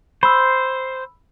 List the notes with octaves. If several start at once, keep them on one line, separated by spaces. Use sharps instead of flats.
C5 B5 E6